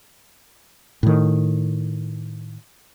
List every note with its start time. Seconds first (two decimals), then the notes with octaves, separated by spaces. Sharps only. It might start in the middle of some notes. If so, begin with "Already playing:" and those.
1.03 A2 D#3